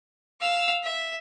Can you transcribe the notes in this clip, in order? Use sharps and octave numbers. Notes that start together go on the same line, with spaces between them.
F5 E6
E5